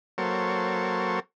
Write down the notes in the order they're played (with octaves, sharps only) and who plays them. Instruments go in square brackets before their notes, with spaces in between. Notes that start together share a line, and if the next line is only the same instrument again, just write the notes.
[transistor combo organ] F#3 A#3 A4 C5 C#5